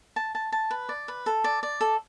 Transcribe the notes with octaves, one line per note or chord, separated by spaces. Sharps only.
A5
A5
A5
B4
D5
B4
A4
D5
D5
A4